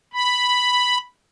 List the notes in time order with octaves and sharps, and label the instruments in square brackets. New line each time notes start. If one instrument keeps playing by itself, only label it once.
[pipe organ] B5